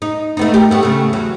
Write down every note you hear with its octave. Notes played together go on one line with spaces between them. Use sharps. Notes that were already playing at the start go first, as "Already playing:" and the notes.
D#4
A3 B3 D#4
G4 A#4
A3 B3
C#3 A3
E2 F#3